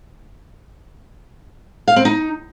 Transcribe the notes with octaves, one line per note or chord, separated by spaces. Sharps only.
F5
C4
D#4